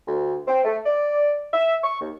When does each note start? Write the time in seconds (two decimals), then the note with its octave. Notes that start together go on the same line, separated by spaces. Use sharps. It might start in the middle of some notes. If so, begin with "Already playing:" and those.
0.08 D2
0.48 C4
0.65 A3
0.86 D5
1.54 E5
1.84 C#6
2.01 D#2